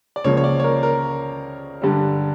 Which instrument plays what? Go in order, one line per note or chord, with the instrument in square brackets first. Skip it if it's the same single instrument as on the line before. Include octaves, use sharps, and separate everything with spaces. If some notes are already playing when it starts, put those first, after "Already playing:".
[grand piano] D5
C#2 C#3 F3 A#3 C#5
C#5
D5
C#5
A#4
A#4
G2 D3 G3